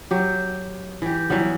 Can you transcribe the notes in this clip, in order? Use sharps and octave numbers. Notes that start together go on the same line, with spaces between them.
F#3 G4
E3 G4
E3 F#3 G3 B3